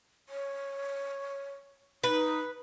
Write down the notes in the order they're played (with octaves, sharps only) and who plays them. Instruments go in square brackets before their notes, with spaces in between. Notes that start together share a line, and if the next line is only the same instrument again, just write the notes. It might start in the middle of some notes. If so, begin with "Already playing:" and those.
[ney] C#5
[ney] D#4 [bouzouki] B4